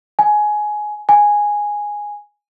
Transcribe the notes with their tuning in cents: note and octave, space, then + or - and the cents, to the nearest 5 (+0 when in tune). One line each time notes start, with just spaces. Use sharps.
G#5 +15
G#5 -5